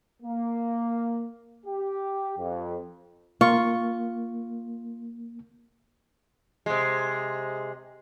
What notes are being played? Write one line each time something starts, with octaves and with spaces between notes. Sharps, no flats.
A#3
G4
F2
A#3 F4 C#6
C3 G#3